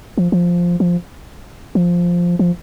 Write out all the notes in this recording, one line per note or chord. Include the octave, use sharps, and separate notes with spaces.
F3
F3
F3
F3
F3